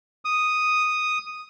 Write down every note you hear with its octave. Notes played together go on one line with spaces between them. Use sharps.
D#6